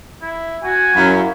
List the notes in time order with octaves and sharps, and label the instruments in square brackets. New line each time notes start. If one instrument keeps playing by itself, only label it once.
[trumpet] E4
[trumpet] F#4 [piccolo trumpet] G#5
[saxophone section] F#2 [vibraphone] E4 F5 A#5 [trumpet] B5